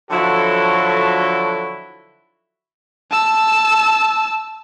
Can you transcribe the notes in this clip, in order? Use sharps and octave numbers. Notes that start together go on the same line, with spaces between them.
D3 F3 F#3 E4 F#4 A4
A5 E6